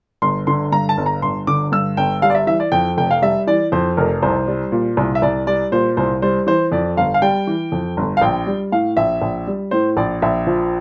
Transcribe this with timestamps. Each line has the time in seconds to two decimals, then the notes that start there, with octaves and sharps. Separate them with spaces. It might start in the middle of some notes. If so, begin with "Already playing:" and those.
0.22 G1 C6
0.47 D3 C6
0.72 G2 A#5
0.89 A5
0.98 G1
1.06 A#5
1.22 G1 C6
1.47 D3 D6
1.72 G2 E6
1.97 G1 G5
2.22 G3 F5
2.30 D5
2.35 E5
2.47 E3 E5
2.60 D5
2.72 F2 G5
2.97 F1 G5
3.11 F5
3.22 G3 E5
3.47 E3 D5
3.72 F2 C5
3.97 F1 A#4
4.22 C2 C5
4.48 G3
4.72 A#2
4.97 C2
5.15 E5
5.22 C2 D5
5.47 G3 D5
5.72 A#2 C5
5.97 C2 C5
6.22 G3 C5
6.47 E3 C5
6.72 F2 D5
6.97 G1 F5
7.14 F5
7.22 G3 G5
7.47 E3
7.72 F2
7.97 G1
8.17 F5
8.21 A#1 G5
8.47 G3
8.72 A2 F5
8.97 A#1 E5
9.22 A#1
9.47 G3
9.71 A2 C5
9.97 A#1 D5
10.22 A#1 E5
10.47 F3